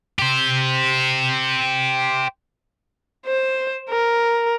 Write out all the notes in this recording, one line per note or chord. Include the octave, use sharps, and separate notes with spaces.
G4 C5
C5
A#4